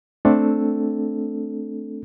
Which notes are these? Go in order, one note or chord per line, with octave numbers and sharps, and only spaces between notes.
A3 C4 D4 A4